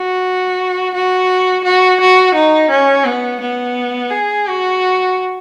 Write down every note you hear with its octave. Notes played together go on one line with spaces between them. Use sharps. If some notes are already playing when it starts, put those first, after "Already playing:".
Already playing: F#4
F#4
F#4
F#4
D#4
C#4
B3
B3
G#4
F#4